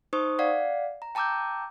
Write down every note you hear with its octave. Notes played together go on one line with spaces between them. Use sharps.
D#4 C5 C#6 D#6
D5 F5 F#5
A#5
G5 A5 A#5 D6 E6 G6